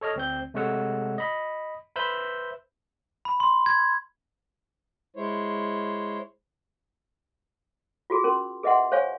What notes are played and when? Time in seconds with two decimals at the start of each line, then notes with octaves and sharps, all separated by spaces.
0.01 A4 C#5 D#5 F6
0.16 D2 C4 G6
0.54 C3 G#3 A3 C#5 F#5 E6
1.18 D#5 B5
1.96 B4 C5 E5 B5 E6 G6
3.25 B5
3.40 C6
3.66 G#6
5.16 G#3 E4 C5 C#5
8.10 F4 F#4 G#4
8.24 C#4 A#4 C6
8.63 G#4 B4 D#5 E5 F#5 C6
8.92 C5 C#5 F5 G#5 C#6